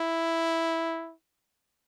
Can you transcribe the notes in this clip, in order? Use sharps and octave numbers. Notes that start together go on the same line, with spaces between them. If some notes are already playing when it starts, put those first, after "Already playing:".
Already playing: E4